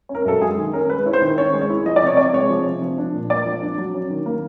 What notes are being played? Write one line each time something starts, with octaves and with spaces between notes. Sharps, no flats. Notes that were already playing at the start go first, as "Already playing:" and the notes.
C#4
A#4
F#2 A4
G#3 G#4
D#3
C#4 A#4
G#3 B4
E4 C#5
C5
D#3
C#4 C#5
G#3
C#5
E4
F3 D#5
D5
C3 C#5
C3 D5
G#3 C#5
F3
C3
F3
D4
A#2
A#3 D5
F3
D4
F#3
C#4
D#3
A#3